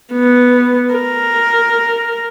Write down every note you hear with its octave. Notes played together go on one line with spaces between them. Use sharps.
B3
A#4